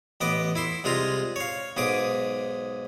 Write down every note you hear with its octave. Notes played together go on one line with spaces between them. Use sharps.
A1 B3 D#5 D6
E4 E5 C6
C2 G#3 F4 G#4 A#5
C#5 F5
B1 G#2 G#4 D6 D#6